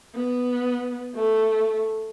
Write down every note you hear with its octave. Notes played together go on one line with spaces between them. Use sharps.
B3
A3